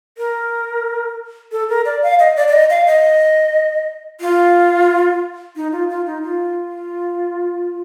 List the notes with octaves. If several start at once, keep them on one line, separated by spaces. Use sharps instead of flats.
A#4
A4
A#4
D5
F5
D#5
D5
D5
D#5
F5
D#5
F4
D#4
F4
F4
D#4
F4